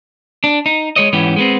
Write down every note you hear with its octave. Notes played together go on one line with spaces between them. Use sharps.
D4
D#4
G#3 C#5 D#5
G#2 E3 B3 C#4 G4
G#3 B3 C4